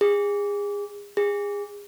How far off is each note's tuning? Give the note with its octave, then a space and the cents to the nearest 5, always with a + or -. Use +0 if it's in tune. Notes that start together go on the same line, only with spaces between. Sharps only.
G#4 -30
G#4 -30